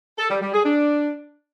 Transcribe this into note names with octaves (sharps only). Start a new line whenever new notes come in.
A4
G3
G3
G#4
D4